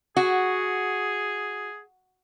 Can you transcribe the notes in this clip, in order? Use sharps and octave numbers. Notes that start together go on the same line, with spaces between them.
F#4 G#4